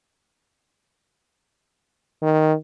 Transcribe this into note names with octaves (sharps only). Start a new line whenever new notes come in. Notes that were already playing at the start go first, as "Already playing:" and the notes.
D#3